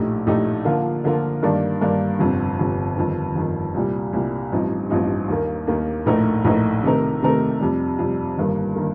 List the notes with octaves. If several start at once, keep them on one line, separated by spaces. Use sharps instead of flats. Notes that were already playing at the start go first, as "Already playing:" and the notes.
Already playing: A#1 A2 A3 D#4 G4
A#1 A2 A3 D#4 G4
D3 F3 A#3 F4
D3 F3 A#3 F4
G2 D#3 A#3 D4
G2 D#3 A#3 D4
G1 F2 C3
G1 F2 C3
G1 F2 D#3
G1 F2 D#3
C2 A#2 G3
C2 A#2 G3
A1 G2 F3 C4 D#4
A1 G2 F3 C4 D#4
D#2 D#3 A#3
D#2 D#3 A#3
A#1 A2 A3 D#4 A#4
A#1 A2 A3 D#4 A#4
C3 D#3 A3 D#4 A#4
C3 D#3 A3 D#4 A#4
F2 C3 G3
F2 C3 G3
G1 G2 D#3 A#3
D#3 A#3